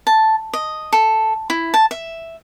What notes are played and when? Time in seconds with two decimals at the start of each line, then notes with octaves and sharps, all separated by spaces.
0.07 A5
0.53 D#5
0.93 A4
1.50 E4
1.74 A5
1.91 E5